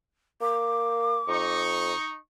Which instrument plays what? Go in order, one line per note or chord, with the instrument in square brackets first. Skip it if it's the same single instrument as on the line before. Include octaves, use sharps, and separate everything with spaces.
[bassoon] A#3 [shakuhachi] D6
[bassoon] F2 [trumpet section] D#4 C#6